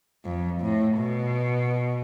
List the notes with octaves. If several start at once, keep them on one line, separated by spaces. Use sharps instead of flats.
F2
A2
B2